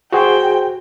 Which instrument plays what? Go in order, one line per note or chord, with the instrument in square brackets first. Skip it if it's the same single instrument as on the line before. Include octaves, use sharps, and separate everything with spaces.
[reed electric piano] F#4 G#4 C5 [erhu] G5